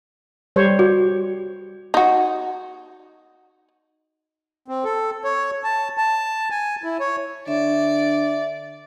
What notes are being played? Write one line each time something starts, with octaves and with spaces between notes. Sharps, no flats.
G3 C5 C#5
F#4
D#4 F#4
C4
A4
C#5
A5
A5
G#5
E4
C#5
D3 D5 E5